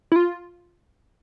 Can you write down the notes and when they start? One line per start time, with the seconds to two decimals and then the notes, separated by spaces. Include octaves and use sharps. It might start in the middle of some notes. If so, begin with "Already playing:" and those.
0.12 E4
0.16 F4